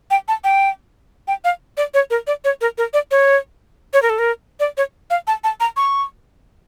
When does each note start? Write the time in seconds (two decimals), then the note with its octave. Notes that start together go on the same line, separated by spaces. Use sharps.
0.11 G5
0.28 A5
0.44 G5
1.28 G5
1.44 F5
1.77 D5
1.94 C#5
2.10 A#4
2.27 D5
2.44 C#5
2.61 A#4
2.78 A#4
2.94 D5
3.11 C#5
3.93 C#5
4.02 A#4
4.10 A4
4.19 A#4
4.60 D5
4.77 C#5
5.10 F5
5.27 A5
5.44 A5
5.60 A#5
5.77 C#6